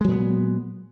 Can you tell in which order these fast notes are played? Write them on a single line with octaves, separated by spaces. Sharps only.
G#3 F#3 A#2 B3